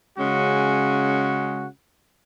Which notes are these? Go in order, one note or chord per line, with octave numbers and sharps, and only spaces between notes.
C#3 G#3 C#4 F#4